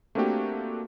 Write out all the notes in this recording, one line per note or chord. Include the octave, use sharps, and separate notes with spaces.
A3 A#3 C4 D4 F#4 G4